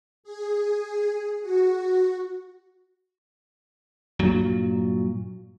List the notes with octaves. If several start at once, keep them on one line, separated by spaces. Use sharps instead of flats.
G#4
F#4
G2 A#2 F#3